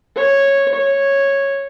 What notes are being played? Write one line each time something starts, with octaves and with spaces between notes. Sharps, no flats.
C#5
C#5